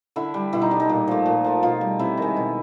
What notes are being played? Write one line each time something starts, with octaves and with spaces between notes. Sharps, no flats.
D3 E4
G3
B2 E4
D#4
G3 D4
D#4
A#2
F3 A3
A#2
F3 A3
B2 F4
G3
C3 E4
D#3 G#3
B2